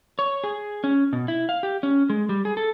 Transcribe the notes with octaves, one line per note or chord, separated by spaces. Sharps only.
C#5
G#4
C#4
B2
E4
F5
G4
C#4
G#3
G3
G#4
A4